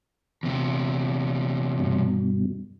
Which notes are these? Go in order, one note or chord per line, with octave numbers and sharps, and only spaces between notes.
E2 C3
G2 B2